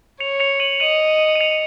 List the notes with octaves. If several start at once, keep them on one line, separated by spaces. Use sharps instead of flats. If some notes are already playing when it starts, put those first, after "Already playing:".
C#5 C#7 F7
C#7 F7
D#7 F#7
D#5 D#7 F#7
D#7
C#7 F7